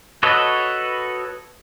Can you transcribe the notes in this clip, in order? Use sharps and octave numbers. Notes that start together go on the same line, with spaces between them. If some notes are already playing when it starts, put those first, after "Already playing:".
F#4 A4 B4 C#5 D#5